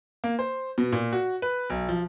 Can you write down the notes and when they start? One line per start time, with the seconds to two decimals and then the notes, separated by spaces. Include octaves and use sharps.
0.24 A#3
0.39 C5
0.78 B2
0.92 A#2
1.13 F#4
1.42 B4
1.70 B1
1.89 F3